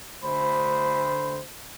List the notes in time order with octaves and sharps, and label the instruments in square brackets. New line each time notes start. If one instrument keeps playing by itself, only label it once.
[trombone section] D2 C5 [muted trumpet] B5